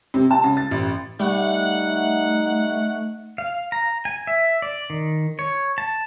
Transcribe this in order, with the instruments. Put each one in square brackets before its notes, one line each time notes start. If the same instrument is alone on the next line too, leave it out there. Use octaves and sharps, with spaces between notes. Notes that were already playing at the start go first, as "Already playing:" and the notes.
[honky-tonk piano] C3
A5
C#3
A6
A1
[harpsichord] G3 [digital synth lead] A3 [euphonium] D#4 [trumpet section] F#5
[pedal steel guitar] F5
A#5
G#5
E5
D5
D#3
C#5
A5